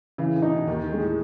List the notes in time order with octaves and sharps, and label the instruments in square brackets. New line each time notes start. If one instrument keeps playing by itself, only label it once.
[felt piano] C#3 [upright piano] E3
[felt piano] A2
[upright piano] D#4
[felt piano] B2
[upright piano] D#2 [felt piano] D#3
[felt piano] D#3
[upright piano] G#3
[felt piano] A2